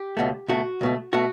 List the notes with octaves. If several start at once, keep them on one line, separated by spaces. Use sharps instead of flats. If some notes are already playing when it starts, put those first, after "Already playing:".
Already playing: G4
C#2 B2 A3
C#2 B2 A3 F#4
C#2 B2 A3
B2 A3 F#4